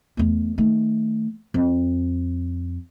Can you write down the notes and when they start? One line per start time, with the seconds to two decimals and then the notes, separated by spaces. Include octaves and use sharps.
0.17 E2 A3
0.58 D#3 A3
1.54 F2